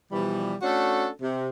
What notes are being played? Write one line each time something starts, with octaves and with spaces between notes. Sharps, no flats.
B2 E3 F3 G3
A3 C#4 D4 F#4 A4
C3